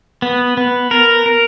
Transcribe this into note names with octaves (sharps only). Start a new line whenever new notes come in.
B3
B3
A#4
A#4